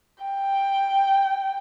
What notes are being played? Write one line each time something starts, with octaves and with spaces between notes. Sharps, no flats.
G5